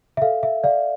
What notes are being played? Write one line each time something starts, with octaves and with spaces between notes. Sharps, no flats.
E5
A4 F5
E5
D5 F5